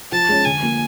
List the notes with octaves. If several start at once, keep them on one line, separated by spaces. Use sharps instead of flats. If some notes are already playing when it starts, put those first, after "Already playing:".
F3 A5
G#3 C#4
D3 G#5
F3 A#3